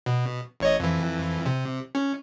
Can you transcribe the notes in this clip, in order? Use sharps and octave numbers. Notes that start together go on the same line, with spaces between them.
B2
A1 C#5 D#5
F2 E3
C3
C#4